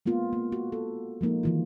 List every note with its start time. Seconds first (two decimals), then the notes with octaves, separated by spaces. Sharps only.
0.06 G#3 A#3 B3 F4
0.33 A#3
0.52 F#4
0.72 A4
1.21 F3 G#3 A#3 D#4
1.43 D#3 E3 F4